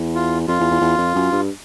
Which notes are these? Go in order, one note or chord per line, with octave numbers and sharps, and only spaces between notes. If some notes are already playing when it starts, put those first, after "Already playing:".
Already playing: E2
F4
F2 F4
E2
E2
E2
F2
F#2
G2